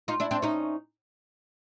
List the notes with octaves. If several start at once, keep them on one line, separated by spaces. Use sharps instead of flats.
D#4 F4
D4 E4
C4 D4
C#4 D#4